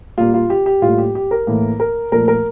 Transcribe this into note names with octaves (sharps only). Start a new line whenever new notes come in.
A#2 G3 A#3 F4
F4
G4
G4
A2 G3 A#3 F4
G4
G4
A#4
A2 E3 A#3
A#4
A#2 F3 A3 A#4
A#4